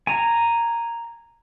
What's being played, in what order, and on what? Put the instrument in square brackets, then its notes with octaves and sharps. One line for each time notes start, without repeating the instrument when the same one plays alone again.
[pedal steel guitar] G#5 A#5